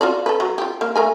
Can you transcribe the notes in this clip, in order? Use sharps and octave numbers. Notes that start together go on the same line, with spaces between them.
F4 F#4 D5
A4 B4
F#3
F4 G4
A#3 F5
A3 A#4 G#5